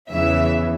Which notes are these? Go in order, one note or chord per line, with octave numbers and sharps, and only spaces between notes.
E2 C#3 E3 E5